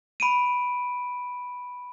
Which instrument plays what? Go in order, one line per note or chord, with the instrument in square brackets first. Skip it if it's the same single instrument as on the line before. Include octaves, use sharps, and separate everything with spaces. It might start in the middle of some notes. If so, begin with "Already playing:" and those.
[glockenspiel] B5 D7 D#7